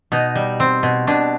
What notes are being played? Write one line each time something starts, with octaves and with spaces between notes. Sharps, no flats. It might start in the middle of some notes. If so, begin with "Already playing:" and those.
B2 D#4
G3
C4
B2
B2 D4